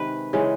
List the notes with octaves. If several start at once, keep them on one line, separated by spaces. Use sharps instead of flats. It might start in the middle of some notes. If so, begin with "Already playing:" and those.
Already playing: C3 D#3 G#3 B4
C#3 E3 G#3